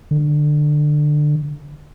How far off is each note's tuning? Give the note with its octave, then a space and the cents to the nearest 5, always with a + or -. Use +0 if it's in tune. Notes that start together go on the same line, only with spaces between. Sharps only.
D3 +20